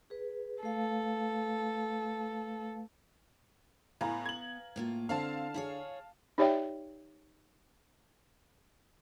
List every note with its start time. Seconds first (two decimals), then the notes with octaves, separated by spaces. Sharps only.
0.10 G#4 B4
0.63 A3 A4 B4 F5
4.01 A2 B3 F5 G#5 A#5
4.26 G#6 F#7
4.76 A2 A#3 F4
5.09 D3 C4 E4 F5 A5
5.54 E4 G#4 C#5
6.38 D#4 G4 C#5 D5 E5 G5